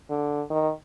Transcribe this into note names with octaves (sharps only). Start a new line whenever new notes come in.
D3
D#3